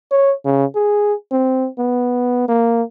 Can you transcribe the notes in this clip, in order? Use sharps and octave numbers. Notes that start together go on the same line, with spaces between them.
C#5
C#3
G#4
C4
B3
A#3